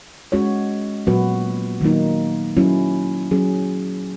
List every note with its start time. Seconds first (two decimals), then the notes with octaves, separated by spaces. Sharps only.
0.32 G#3 C#4 F#4 C#5
1.07 A#2 F#3 B3 F#4 B4
1.81 D#3 F#3 A#3 D#4
2.57 F#3 C#4 E4
3.31 F#3 C#4 G#4